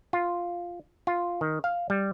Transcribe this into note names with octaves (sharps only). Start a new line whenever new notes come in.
F4
F4
D#3
F5
G3